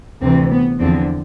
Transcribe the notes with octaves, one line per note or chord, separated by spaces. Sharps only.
D2 C3 E3 C4
B3
E2 D3 F3 C4